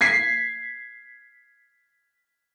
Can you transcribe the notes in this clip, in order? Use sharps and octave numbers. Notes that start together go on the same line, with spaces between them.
G#6 B6 C7